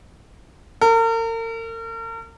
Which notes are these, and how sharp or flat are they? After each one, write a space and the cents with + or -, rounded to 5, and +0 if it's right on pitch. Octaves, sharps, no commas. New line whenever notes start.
A#4 -40